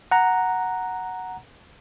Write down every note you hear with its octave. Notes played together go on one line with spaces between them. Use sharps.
F#5 A#5